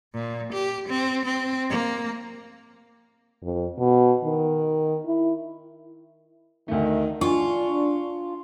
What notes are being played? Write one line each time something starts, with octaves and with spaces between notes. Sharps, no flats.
A#2
G4
C4
C4
A#3
F2
B2
D#3
E4
D2 D#3 A3
D4 F4 G#5 C#6